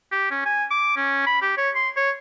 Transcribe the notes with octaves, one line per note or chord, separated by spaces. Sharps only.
G4
C#4
G#5
D6
C#4
B5
G4
C#5
C6
C#5